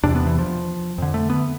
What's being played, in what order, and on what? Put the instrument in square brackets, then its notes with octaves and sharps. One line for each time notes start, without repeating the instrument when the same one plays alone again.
[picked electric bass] E2 C3 D4
B3
E3
F3
F2 D3
A3
B3